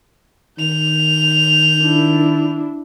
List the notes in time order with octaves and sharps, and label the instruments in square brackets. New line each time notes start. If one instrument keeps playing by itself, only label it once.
[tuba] D#3 [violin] G6 F7
[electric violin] D4 E4